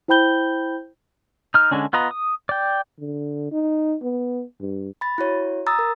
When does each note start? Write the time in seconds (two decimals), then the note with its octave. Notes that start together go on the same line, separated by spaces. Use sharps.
0.08 E4 C5 G5 B5 G6 G7
1.54 D#4 F6
1.71 D3 G#3 C#4 D4
1.93 B3 F4 B4 D#5 A#5
2.11 D#6
2.49 D5 G5
2.99 D3
3.52 D#4
4.02 B3
4.61 G2
5.01 B5 A6
5.18 E4 F#4 C#5
5.67 A#5 D#6 E6 A6
5.79 A#4